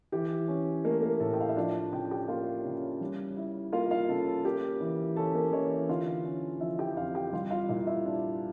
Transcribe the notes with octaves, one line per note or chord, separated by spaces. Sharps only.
E3 G4
C#4
A3 A#3 A#4
A#3 A#4
A2 A4
G5
F5
E5
F3 D4 D5
C#3 G5
G4 G5
A#3 F4 F5
C#3
G3
E4
A#3 F4 F5
F4 F5
C#3 A4
A4
A#3 G4
E3
C#4 A4
A#3 A#4
E3 C#4 C#5
D3 F4 F5
C#4
F3 E4 E5
G4 G5
F2 F4 F5
G4 G5
G3 F4 F5
F4 F5
A#2 E4 E5
E4 E5
D4